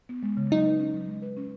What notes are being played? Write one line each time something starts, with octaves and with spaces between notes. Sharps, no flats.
B3
G#3
C#3
F#3 D#4
B4
C#4
F#3
G#3
B4
C#4